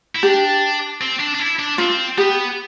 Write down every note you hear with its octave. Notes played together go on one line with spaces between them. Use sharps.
E4
D4 G4
C4
D4
D4
E4
D4
C4 F4
B3 G4